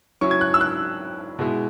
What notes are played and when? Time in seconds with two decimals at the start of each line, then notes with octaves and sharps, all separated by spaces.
0.21 F#3 C#4 E4 C#6
0.31 G#6
0.41 F#6
0.54 E6
0.61 F#6
1.39 B2 G#3 E4